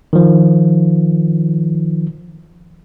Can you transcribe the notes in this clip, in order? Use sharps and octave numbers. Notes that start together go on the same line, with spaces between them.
D#3 F3